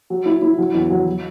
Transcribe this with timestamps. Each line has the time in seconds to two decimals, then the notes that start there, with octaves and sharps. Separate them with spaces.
0.10 F#3
0.26 E4
0.42 E4
0.58 F#3
0.74 E2
0.90 F#3
1.06 F#3